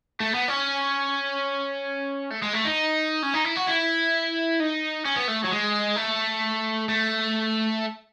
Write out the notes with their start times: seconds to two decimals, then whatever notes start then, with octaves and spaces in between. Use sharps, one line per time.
0.20 A3
0.34 B3
0.48 C#4
2.30 A3
2.42 G#3
2.53 A3
2.65 D#4
3.23 C#4
3.34 D#4
3.44 E4
3.57 F#4
3.67 E4
4.60 D#4
5.05 C#4
5.16 B3
5.28 A3
5.44 F#3
5.51 G#3
5.96 A3
6.89 A3